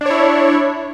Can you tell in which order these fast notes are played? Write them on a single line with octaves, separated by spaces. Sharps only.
D4 C#5 E4